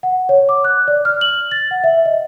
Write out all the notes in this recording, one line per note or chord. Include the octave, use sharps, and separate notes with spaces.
F#5
C#5
D6
F#6
D5
F6
F#7
A6
F#5
E5
D#5